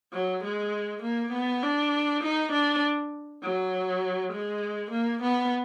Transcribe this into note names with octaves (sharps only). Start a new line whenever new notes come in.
F#3
G#3
A#3
B3
D4
D#4
D4
F#3
G#3
A#3
B3